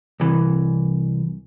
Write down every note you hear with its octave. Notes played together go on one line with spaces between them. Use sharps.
C2 E3